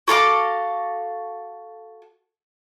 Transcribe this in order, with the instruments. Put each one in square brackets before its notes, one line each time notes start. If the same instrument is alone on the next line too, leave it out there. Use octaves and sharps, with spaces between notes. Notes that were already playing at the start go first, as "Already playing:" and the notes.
[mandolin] F#4 A4 F5 D6